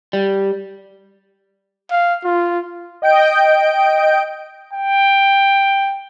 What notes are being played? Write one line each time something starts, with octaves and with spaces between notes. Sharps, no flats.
G3
F5
F4
D#5 G5 G6 D7
G5